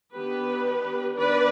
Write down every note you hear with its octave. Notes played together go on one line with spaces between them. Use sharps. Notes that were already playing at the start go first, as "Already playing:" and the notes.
D#3 B3 D4 G4 B4
D#3 B3 D4 B4 D5